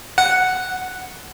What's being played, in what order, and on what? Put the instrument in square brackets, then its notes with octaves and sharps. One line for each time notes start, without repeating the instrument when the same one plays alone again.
[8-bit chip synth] F#5